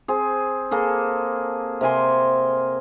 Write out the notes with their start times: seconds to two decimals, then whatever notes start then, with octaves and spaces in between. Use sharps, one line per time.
0.08 C4 G#4
0.71 A#3 G#4 A4
1.81 C3 A#4 G#5 C6